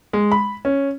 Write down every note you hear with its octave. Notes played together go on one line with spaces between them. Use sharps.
G#3
B5
C#4